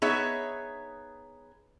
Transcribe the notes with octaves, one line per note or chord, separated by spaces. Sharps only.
B3 D#4 G#4 C#5 E5